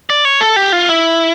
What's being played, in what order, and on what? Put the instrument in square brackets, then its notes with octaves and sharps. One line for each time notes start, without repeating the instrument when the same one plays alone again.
[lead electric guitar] D5
C#5
A4
G4
F4
E4